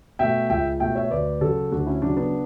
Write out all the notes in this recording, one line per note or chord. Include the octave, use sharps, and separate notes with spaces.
B2 A3 E5 G5
C#2 E5 G5
B2 A3 E5 G5
C#5 E5
D2 B4 D5
C#3 F#3 F#4 A4
D2 D4 F#4
C#4 E4
C#3 F#3 D4 F#4
B3 D4